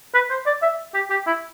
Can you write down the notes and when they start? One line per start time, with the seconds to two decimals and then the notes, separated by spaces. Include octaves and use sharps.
0.14 B4
0.30 C5
0.46 D5
0.62 E5
0.94 G4
1.10 G4
1.27 E4